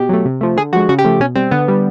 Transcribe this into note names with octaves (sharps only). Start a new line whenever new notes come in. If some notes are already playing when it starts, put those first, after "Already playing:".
Already playing: B2 G4
F#3 A3
C3
F3 A3
D3 G#4
F3 G#3 F#4
C#3 F#4
G4
F3 A3
B2 C#4
G3 C4
D3 B3
G3